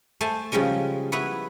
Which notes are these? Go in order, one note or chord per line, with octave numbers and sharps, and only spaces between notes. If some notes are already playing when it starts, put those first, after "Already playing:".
A3 C5 G#5 A5
C#3 F3 G3 G#3 C#4
B3 E4 B4 C#5